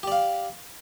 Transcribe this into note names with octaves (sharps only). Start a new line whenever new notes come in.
G4 D5 F5